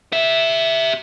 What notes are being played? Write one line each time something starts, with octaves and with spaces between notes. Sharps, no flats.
G4 E5